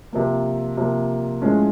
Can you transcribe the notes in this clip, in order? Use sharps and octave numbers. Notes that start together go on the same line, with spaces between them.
C3 F3 A#3
C3 F3 A#3
A2 F3 G#3 C#4